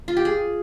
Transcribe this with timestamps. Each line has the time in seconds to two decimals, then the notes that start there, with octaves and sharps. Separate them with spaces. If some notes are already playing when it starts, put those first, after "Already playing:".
0.08 F4
0.17 G4
0.25 G#4